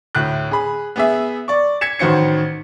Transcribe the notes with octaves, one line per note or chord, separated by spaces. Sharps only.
D2 A2 F#6
G#4 B5
B3 G#4 E5
D5 C#6
G#6 B6 C#7 E7
A1 D#3 F#4 C5 C#7